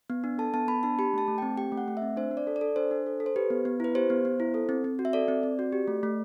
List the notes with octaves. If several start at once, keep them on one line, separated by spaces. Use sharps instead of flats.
B3
D4
A4 A5
B3 A5
B3 B5
D4 A5
G4 B5
A3 A5
A3
C4 G5
G4 G5
A3
F#5
A3
E5
C4
D4 C5
D4
D5
A4
D5
A4
D4 C5
D4
A4
A4
C5
G4 B4
B3
B3
E4 B4
G4 C5
B3
B3
E4
A4
C4
C4
F#4
E5
A4 D5
C4
C4
F#4
G4
A3
A3